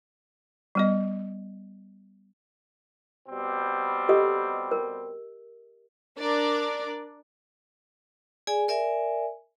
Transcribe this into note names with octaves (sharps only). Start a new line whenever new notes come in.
G3 B3 D#5
B2 G3 C4
G4 A4 D#5
A#4
D4 A#4 D5
G#4 D5 G#5
A#4 D5 E5 G#5